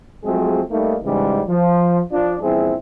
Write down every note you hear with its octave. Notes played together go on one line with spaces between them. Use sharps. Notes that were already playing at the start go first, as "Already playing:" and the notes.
F3 F#3 G#3 A3 C4 G#4
G3 A3 A#3 D#4
G#2 C#3 E3 G3 G#3
F3
F3 D4
A#1 E2 G3 C4 E4 G#4